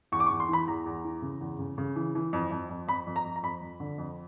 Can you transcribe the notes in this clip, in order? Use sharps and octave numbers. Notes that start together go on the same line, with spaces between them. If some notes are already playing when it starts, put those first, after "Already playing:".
E2 C#6
D6
E2 C#6
C6
E3 B5
E2 A#5
E2
E3
C#3
E2
C#3
C#3
E3
E3
F2
F2
F2
F2 B5
F2
A#5
F2
A#5
F2 B5
F2
D3
F2